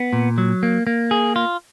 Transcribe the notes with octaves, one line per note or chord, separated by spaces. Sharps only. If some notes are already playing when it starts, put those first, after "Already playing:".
Already playing: B3
A#2
F#3
A#3
A#3
G#4
F4